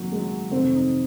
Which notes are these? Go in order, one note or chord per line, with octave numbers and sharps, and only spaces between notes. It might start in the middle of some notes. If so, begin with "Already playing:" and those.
Already playing: F#1 F2 D#3 F#3 A#3
G#3
F#3
F1 F2 D#3 C4
D#4